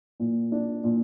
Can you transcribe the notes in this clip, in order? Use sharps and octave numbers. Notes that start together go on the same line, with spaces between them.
A#2
D4
A#2